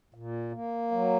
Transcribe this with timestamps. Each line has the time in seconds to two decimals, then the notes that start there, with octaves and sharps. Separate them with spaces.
0.14 A#2
0.52 A#3
0.91 F#3